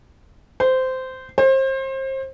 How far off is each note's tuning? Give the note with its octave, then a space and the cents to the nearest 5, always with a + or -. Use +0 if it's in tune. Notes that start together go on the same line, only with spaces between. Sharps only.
C5 -15
C5 +30